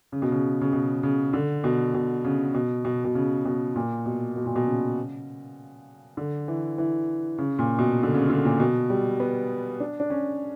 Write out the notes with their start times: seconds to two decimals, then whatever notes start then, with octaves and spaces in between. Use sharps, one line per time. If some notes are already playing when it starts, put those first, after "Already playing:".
0.12 C#3
0.22 B2
0.32 C#3
0.61 C#3
0.73 B2
1.03 C#3
1.33 D3
1.64 B2
1.94 B2
2.25 C#3
2.54 B2
2.85 B2
3.04 B2
3.15 C#3
3.45 B2
3.76 A#2
4.06 B2
4.36 B2
4.46 A#2
4.56 B2
4.66 C#3
6.17 D3
6.48 E3
6.78 E3
7.38 C#3
7.59 A#2
7.78 B2
8.03 D3
8.14 C#3
8.30 D3
8.45 A#2
8.60 B2
8.90 G3
9.20 B3
9.80 D4
10.00 D4
10.10 C#4